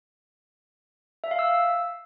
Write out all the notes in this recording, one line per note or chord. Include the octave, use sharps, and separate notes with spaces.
E5
F5
E6